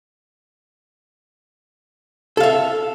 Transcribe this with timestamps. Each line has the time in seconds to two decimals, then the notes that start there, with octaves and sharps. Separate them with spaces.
2.37 A4
2.40 F5
2.43 E5